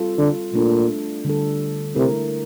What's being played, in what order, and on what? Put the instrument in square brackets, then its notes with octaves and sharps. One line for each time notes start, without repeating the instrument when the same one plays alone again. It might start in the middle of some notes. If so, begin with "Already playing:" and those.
Already playing: [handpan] G3 C4 F4 A4
[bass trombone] D3
[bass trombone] A#2 [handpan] A3 D4 A4
[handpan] D3 G3 D4 A4
[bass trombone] C3 [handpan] A3 E4 A#4